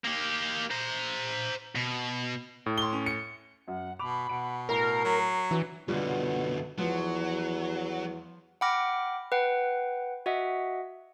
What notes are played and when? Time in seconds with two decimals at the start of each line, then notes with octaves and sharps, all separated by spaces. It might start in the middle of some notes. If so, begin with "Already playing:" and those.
0.05 A#3 G4
0.71 C5 A#5
1.75 B2
2.66 A2
2.78 C6 G7
2.93 C#4
3.06 C#7
3.68 F#2 F#5
3.99 B2 B5 D6 F7
4.29 B2 F#5 D7
4.69 A2 A#4 A#5 C7
5.04 F#3
5.51 E3 D4 F#4 B4
5.88 F#2 B2 D3 G3 F4
6.78 E2 F3 F#3 B4
8.61 F#5 G5 B5 D6 F6 A#6
9.32 B4 F#5 G5
10.26 F#4 D#5 E5 F#5